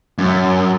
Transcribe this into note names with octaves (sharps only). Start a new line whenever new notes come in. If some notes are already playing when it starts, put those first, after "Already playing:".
F#2